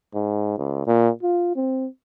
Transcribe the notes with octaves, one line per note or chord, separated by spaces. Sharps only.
G#2
C#2
A#2
F4
C4